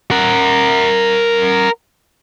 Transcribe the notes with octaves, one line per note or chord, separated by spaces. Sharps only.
A#4 F#5